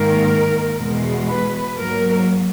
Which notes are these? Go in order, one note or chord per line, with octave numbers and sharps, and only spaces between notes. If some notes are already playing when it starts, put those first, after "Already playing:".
Already playing: G#2 D#3 A#3 A#4
E2 B2 G#3
B4
G#2 F#3 A#3 A#4